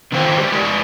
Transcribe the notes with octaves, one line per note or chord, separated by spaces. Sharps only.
D3 D#3 C4 F4 C5 G5
G#3 G4
G#3 A#4 D5